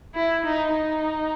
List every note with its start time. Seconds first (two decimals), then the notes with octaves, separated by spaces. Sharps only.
0.15 E4
0.46 D#4
0.74 D#4